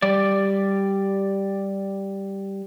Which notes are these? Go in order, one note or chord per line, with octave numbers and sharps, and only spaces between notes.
G3 D5